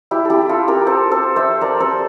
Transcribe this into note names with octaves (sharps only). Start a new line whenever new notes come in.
E4 G4
E4 G4 A4
F4 A4
G4 A#4
A4 C5
A4 C5
C5 E5
A#4 D5
A4 C5